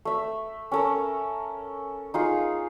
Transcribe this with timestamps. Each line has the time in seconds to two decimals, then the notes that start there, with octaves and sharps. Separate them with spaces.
0.05 A3 E5
0.72 C#4 A4 A#4
2.14 D#4 F4 G#4